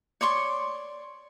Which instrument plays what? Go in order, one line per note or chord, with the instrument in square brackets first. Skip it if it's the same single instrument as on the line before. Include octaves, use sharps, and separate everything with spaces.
[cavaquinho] C#5 D5 C6 C#6